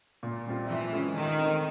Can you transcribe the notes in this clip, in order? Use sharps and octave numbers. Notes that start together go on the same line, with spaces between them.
A#2
G3 C4 F4
E3 F3
G#3 C#4 F4 A4
D#3 A3
C4 D#4